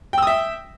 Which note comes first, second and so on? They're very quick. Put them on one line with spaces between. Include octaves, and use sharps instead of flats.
G5 E6 D#6 E5